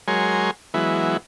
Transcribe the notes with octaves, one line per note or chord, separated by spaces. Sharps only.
F#3 G#3 A#4 C#5 G#5 C6
E3 F#3 G#3 B3 E4